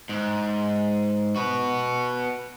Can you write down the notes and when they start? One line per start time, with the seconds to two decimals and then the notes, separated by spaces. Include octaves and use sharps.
0.09 G#2
1.35 F#4 B4